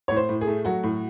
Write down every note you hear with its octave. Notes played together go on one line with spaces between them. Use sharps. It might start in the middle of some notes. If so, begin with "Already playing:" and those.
A2 C#5
C5
A2
G#4
A3
F#3 F#4
A2